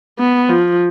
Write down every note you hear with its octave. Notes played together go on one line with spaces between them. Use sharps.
B3
F3